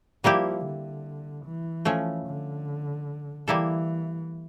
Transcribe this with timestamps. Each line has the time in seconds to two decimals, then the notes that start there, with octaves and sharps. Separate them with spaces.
0.24 F3 G3 A#3 E4 G4
0.65 D3
1.45 E3
1.85 F3 A3 C#4
2.27 D3
3.47 E3 G3 A#3 E4 A4